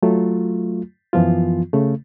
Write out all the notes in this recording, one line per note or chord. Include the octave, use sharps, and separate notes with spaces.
F#3 A3 F4
F#2 E3 F3 B3 F4
C#3 A3